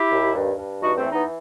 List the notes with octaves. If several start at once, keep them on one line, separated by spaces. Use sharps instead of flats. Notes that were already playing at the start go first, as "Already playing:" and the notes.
Already playing: E4 G4
D#2
G2
G2
E2 D#4 F#4
A3 C4
E3
B3 D#4